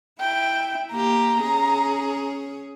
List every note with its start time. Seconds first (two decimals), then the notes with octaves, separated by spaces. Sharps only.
0.20 E4 G5
0.92 A#3 G4 A#5
1.41 C#4 G#4